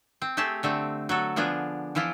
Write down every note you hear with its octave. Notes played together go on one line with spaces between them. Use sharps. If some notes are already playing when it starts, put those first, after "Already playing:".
C4
A3 G4 G#4 A5
D3 A3 C4
F#3 F#4 A4
D3 F3 B3 D4 G#4
E3 F3 E4 F4